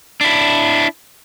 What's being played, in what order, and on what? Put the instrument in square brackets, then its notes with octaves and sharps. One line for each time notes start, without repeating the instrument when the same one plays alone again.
[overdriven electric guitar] D4 E4